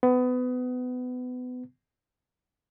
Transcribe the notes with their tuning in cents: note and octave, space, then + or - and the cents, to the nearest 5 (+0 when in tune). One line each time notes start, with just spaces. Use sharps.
B3 +25